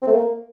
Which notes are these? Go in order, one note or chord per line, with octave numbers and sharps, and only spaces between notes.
C4
A3
A#3